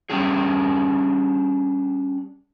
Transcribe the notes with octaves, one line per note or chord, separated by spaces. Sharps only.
G3 C#4 D4 G4 G#4